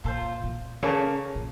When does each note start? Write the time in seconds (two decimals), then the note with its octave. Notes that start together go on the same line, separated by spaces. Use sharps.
0.04 A#2 F4 A4 C5
0.43 A#2
0.82 C#3 A#3 C#4 A4 C#5
1.35 A#2